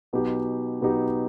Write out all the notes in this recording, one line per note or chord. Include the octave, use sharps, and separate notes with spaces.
B2 F#3 B3 D#4 G4
B2 F#3 B3 D#4 G4